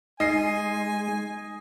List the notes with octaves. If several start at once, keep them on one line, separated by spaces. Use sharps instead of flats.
G#3 D#4 D#5 G#5 C7